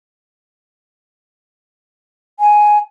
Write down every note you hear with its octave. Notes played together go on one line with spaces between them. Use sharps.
G#5